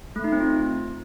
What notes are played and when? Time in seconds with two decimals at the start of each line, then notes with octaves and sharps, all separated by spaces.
0.16 A3
0.24 D#4
0.32 C4
0.40 F4